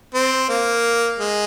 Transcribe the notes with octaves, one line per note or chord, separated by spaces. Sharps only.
C4
A#3
G#3